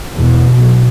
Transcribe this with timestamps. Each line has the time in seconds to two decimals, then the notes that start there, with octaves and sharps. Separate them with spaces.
0.15 E2 B2
0.54 B1